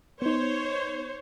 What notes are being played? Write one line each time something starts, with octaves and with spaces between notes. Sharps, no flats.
B3 D#4 C5 C#5